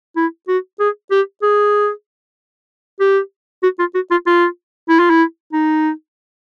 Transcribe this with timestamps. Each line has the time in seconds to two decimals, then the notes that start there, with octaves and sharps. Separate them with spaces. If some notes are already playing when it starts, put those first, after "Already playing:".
0.17 E4
0.48 F#4
0.80 G#4
1.11 G4
1.43 G#4
3.00 G4
3.63 F#4
3.79 F4
3.95 F#4
4.11 F4
4.27 F4
4.89 E4
5.00 F4
5.11 E4
5.53 D#4